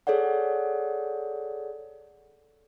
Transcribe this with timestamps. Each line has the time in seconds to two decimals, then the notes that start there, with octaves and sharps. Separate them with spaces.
0.07 G#4 A4 C#5 D5 F#5